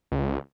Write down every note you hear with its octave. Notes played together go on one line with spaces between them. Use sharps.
C#2